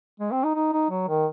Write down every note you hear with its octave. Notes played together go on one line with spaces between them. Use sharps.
G#3
C4
D#4
D#4
D#4
F#3
D#3